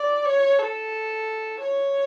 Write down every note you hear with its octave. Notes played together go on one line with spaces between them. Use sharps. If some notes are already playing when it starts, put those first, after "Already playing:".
Already playing: D5
C#5
A4
C#5